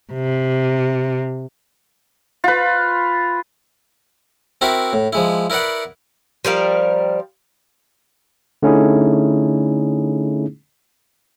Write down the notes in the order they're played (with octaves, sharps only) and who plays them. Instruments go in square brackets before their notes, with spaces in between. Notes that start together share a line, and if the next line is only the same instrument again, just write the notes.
[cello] C3
[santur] F4 B4
[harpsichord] C4 E4 F#4 A#4 E5
A2
F3 G#3 E4
E4 A#4 B4 D5 F#5
[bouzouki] F3 G3 A#4 F5
[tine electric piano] D3 A3 C#4 D#4 E4 G#4